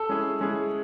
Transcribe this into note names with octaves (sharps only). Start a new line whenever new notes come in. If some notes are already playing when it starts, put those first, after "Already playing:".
Already playing: A4
G#3 C#4 E4 G#4
G#3 C#4 E4 G#4